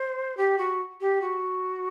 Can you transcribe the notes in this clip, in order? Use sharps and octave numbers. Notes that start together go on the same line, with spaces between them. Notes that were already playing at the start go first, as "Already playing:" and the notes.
Already playing: C5
G4
F#4
G4
F#4